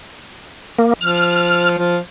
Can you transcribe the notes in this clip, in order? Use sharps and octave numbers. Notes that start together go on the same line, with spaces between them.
A#3
F3 F6
F3